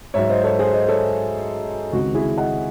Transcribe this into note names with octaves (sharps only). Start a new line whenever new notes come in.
G#2 F#3 C#5 E5
C5 D#5
A4 C#5
G#4 C5
C5 D#5
A4 C#5
C#2 C3 D#3 G#3 F#4
E4 G#4
D#5 F#5